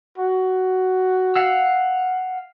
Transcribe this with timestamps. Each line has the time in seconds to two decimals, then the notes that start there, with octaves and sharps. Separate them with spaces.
0.18 F#4
1.36 F5 F#5 E6